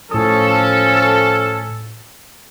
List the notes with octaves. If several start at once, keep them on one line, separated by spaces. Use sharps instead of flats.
A2 F3 C#4 A4 D#6